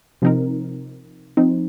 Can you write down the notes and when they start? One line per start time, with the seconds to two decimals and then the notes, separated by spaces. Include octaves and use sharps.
0.22 C3 F3 C4 D#4 A#4
1.37 F3 C4 D#4